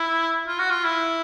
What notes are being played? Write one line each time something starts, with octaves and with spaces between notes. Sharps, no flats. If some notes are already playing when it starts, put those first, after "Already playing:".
Already playing: E4
F4
F#4
F4
E4